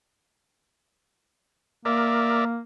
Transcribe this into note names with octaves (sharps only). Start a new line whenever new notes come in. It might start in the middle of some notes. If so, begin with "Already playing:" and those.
A#3 A#4 D5 E5